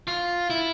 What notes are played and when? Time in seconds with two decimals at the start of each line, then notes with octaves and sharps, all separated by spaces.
0.08 F4
0.50 E4